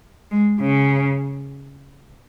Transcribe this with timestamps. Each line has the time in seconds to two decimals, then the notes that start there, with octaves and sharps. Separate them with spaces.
0.31 G#3
0.61 C#3